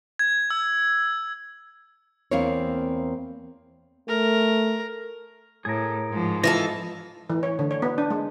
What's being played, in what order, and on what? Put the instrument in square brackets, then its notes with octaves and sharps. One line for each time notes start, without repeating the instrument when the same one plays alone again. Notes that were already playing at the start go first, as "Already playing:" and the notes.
[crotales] G#6
E6
[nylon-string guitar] E2 A#3 C4 E4 A#4 C#5
[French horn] A3 [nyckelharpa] A#4
[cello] A2 [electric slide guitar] G#4 A#4
[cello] G#2 F3
[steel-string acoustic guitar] E3 F4 A4 [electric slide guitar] D#5
[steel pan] E3
C#5
D3
C#5
B3
D4
G#3